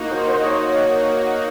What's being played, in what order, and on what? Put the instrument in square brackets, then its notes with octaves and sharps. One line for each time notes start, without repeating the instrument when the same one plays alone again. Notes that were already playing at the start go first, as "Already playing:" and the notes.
Already playing: [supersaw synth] A#3 D#4 F#4
[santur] C5
C5
D#5
C#5